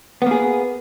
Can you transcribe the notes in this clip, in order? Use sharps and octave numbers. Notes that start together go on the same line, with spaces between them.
A#3 B3 G#4